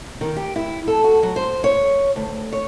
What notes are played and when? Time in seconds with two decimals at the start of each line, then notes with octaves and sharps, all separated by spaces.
0.21 D#3
0.37 G4
0.56 E4
0.88 A4
1.04 F#4
1.23 F#3
1.36 C5
1.64 C#5
2.16 D2
2.53 C#5